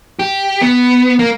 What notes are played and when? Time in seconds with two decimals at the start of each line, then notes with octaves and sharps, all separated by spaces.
0.19 G4
0.61 B3
1.19 A#3